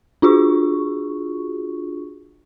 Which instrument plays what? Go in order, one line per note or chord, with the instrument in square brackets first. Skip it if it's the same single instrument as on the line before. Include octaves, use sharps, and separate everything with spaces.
[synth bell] D4 F4 F#4 G#4 C#6